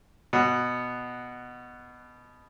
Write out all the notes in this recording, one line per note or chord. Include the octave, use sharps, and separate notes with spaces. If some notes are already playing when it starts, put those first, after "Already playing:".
B2 F#5